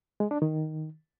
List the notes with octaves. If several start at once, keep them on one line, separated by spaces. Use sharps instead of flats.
G#3
D4
D#3